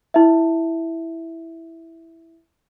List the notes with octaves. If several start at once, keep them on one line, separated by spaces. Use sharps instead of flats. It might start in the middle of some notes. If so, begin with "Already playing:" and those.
E4 E5